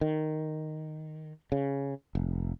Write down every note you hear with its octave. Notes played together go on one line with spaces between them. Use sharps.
D#3
C#3
F1